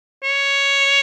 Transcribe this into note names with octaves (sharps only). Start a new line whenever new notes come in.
C#5